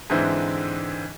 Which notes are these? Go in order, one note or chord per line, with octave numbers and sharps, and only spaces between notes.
G#2 D3 E3 C4 E4